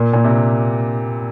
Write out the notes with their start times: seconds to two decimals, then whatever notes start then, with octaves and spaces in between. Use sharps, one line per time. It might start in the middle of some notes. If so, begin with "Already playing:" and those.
Already playing: A#2
0.13 A#2
0.24 C3